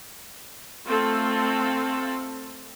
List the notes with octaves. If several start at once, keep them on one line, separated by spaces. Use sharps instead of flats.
A3 C4 F4 A4